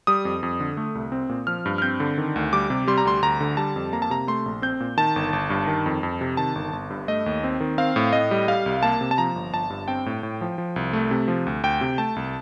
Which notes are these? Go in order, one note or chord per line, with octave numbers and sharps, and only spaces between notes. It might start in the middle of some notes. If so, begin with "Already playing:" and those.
G3 D#6
F2
F2
D3
A3
C2
C4
A#2
F3 F6
G2
F6
C4 G6
D3
D#3
D2
G3 D6
C3
G3 C6
A#5
D2 C6
D2 A#5
D3
G3 A5
F2
A#3 A#5
A5
C3 A#5
A3 C6
A#1
C4 G6
A#2
D#3 A5
G1
G1
G2
D#3
F2
F2
C3
D#3 A5
G1
G1
G2
A3 D#5
D#2
C4
D#3
C4 F5
A2
A2 D#5
G3
G3 F5
C2
A#3 A5
C3
A5
F3 A#5
G1
G1 A5
G2
C4 G5
A2
A2
F3
F3
C2
A3
C3
F3
D2
D2 G5
C3
A3 A5
C2